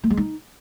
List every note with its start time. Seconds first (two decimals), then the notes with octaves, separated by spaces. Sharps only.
0.04 A3
0.10 G#3
0.17 D#4